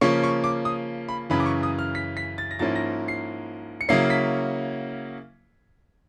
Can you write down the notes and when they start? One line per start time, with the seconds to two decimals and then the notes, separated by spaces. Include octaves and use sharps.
0.01 C#3 F3 A#3 C#4 C#6
0.23 C#6
0.44 D6
0.65 D#6
1.08 B5
1.30 F#2 C#3 E3 B5
1.40 D6
1.46 C#6
1.63 D#6
1.79 F6
1.95 B6
2.17 B6
2.38 A6
2.51 A#6
2.59 G#2 F3 A#3 C#4 E4 A6
2.76 A#6
3.08 C7
3.81 C#7
3.89 C#3 F#3 A#3 C#4 E4 C7
4.10 B6